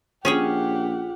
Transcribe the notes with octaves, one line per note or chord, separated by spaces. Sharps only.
A#1 C#4 F4 G4 G#4 C#5 F#5